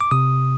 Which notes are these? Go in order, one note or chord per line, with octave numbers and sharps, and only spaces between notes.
D6
C3 D#6